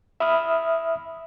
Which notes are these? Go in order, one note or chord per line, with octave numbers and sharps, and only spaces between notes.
E5 B5 D#6 F6